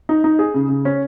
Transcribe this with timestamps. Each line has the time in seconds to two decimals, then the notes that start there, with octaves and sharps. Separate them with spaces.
0.09 D#4
0.24 D#4
0.39 G#4
0.54 C#3
0.69 C#3
0.85 C#4